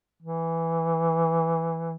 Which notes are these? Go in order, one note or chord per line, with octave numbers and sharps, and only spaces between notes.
E3